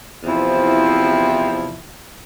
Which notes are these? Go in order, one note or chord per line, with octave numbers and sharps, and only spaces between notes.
E2 C3 F3 C4 E4